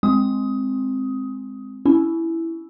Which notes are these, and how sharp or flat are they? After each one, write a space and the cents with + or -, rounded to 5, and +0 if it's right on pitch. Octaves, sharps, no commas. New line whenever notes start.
G#3 +0 C4 +0 D#6 +15
C#4 +25 E4 +0